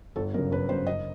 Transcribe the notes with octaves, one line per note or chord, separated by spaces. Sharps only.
G1 A4
F#2 C#3 A#4
G1 B4
F#2 C#3 C5
F#1 D#5